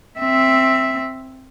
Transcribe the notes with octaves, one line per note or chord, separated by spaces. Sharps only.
C4 E5